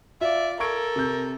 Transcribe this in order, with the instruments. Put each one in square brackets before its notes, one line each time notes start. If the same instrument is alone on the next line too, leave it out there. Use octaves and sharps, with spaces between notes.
[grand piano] F4 [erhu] D5 [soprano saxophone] E5
[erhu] A4 [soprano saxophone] A#4 [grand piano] C#6 G#6 D7
[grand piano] C3 G6